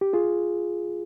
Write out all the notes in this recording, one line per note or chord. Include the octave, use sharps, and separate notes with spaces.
G4
F4 G#4